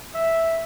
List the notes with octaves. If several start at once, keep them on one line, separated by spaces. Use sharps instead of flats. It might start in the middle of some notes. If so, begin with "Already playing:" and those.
E5